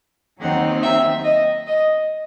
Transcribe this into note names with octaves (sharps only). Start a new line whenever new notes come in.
D#2 D#3 F#3 C4 D#4 F#5
E5
D#5
D#5